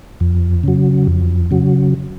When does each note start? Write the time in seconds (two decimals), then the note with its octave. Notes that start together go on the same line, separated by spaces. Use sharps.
0.20 F2
0.64 C#3 F#3
1.07 F2
1.51 C#3 F#3